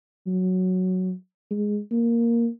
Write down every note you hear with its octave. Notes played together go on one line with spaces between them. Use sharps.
F#3
G#3
A#3